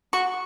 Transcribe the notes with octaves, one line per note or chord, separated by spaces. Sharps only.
F#4 C#6